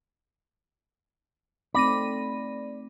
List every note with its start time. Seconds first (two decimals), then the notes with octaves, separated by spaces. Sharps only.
1.74 A3 C4 D#4 D5 B5 A#6 D#7